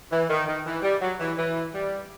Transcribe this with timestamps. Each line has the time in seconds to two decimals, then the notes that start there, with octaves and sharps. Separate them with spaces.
0.11 E3
0.29 D#3
0.47 D#3
0.65 E3
0.82 G3
1.01 F#3
1.19 E3
1.37 E3
1.74 G3